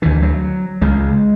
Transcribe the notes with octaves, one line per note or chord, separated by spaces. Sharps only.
D2 D3 E3
F#3
C#2 C#3 G#3